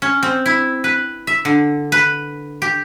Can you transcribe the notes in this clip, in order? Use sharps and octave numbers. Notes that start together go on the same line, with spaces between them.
C#4
C4
E4
B4
E5
D3
B4
G4